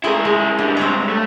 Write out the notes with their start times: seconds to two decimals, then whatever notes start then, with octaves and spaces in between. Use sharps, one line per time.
0.04 G#3 A3 E4 A#4 D#5
0.25 G#3
0.59 G#2 G3 D4
0.77 C4 C#5 A#5
1.09 A3